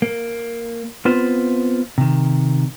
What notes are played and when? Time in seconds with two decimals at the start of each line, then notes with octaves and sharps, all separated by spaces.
0.02 A#3
1.05 B3 C4 F4 B4 C5
1.98 C3 D#3